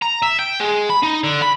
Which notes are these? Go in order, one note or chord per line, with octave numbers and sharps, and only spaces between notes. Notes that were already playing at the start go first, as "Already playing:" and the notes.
A#5
E5
G5
G#3
B5
D#4
D3
B5